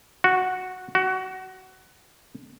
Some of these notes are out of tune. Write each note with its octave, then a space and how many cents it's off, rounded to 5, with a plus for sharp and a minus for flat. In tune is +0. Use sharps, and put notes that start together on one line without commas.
F#4 -5
F#4 +20